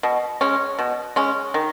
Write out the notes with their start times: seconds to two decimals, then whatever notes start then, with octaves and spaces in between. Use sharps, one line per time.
0.03 B2
0.41 G#3 C#4
0.79 B2
1.16 G#3 C#4
1.54 D#3